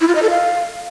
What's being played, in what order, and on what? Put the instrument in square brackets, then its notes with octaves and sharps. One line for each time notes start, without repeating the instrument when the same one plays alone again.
[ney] E4
F4
D#5
A4
F5